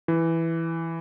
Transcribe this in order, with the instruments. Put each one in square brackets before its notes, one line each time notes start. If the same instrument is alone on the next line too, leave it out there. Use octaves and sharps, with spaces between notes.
[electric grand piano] E3